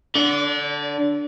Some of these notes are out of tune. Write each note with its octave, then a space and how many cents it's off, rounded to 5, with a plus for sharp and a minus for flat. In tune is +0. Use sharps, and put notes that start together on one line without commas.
D3 +0 D5 -35